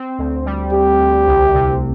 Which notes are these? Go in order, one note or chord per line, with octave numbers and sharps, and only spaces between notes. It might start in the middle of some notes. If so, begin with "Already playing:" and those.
Already playing: C4
D2
G3
D2 G4
D2
C2
C3